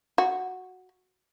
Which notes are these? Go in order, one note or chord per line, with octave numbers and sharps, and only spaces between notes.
F#4